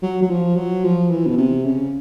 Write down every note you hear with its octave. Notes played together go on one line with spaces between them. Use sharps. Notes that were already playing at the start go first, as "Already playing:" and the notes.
F#3
F#3
F3
F#3
F3
E3
B2
C3
C#3